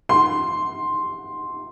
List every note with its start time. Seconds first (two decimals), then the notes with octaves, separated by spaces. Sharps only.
0.09 C6